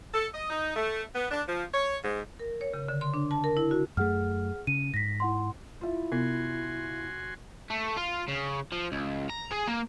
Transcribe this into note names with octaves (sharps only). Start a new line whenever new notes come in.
A4
D#5
D#4
A3
B3
D4
F3
C#5
G#2
A#4
C#5
C#3
D3
C6
D4
A5
A#4
E4
F#4
F#2 A3 G#4 F#5 F6
C#3 D#7
G#2 A#6 B6
E4 F#5 C6
E4 F4 E5
C3 B3 F#4 G#5 C6
A3
F4
C#3
F3
C#2
A#5
G#4
A#3